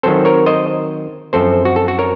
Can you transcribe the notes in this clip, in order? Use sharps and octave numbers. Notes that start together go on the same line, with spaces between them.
D#3 F#3 C4 A4 C5
A#4 C#5
C5 D#5
F#2 F3 C4 A4 C5
F#4
A4
F#4
A#4 C#5